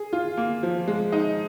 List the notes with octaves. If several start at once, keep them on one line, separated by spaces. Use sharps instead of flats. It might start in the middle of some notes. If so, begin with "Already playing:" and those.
Already playing: G#4
F4
A#3
F3
G#3
D#4